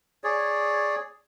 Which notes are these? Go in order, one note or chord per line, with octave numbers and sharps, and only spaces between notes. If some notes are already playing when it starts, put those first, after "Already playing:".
G#4 C#5 D5